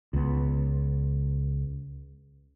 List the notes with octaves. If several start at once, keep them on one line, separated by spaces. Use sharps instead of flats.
C#2 B3